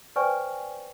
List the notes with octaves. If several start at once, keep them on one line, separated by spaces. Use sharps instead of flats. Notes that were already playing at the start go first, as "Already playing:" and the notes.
B4 C5 D5 G5 G#5 C#6